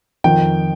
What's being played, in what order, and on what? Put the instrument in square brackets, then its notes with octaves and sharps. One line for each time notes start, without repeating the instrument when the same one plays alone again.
[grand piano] F2 D#3 G5